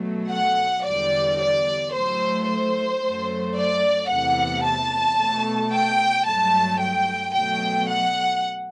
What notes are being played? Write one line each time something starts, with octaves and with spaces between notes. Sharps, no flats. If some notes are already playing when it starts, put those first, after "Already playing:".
Already playing: B2 F#3 A3
F#5
E2 D3 G3 D5
D5
A2 F#3 A3 C5
C5
F#2 F#3 A3
D5
E2 C3 E3 A3 F#5
A5
B2 A3
G5
G2 F#3 A3 A5
G5
B2 F#3 A3 G5
F#5